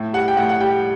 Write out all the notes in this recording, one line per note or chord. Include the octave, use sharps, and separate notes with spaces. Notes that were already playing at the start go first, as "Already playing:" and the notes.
Already playing: A2
G3 F#5
G5
A2 F#5
F#5
G3 G5